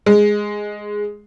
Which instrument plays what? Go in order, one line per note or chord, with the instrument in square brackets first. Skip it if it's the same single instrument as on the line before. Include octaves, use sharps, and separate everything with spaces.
[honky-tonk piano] G#3